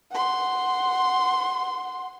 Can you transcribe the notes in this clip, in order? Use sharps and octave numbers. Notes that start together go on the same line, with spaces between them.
F#5 C6